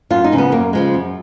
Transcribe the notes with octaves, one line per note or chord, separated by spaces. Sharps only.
F#2 F4
D#4
C#3 F3 G#3
B3
F#2 A#3
C#3 F3 G#3
F#2